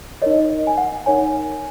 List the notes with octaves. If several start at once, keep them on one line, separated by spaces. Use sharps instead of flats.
D#4 A#4 C#5 D#5
D#5
G#5
F#5
D#4 A#4 C#5 G#5